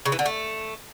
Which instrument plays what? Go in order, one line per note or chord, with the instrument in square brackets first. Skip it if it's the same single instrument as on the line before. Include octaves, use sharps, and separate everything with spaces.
[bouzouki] C#3
E3
D3
A3